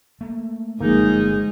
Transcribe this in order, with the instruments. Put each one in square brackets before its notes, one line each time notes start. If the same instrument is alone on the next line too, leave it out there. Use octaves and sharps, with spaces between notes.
[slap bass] A3 A#3
[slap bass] G1 [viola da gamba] G#2 G#4 [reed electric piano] F3 A#3 [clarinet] D#4